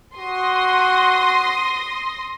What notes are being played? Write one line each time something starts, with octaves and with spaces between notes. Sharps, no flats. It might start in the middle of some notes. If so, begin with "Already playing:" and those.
F#4 C6 D#6 A#6